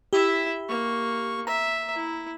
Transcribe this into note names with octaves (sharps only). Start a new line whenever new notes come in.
E4 G4 E5
A#3 C#6
E5 A#5
E4